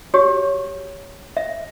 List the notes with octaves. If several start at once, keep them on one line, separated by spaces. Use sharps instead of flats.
F#4 G4 C#5
E5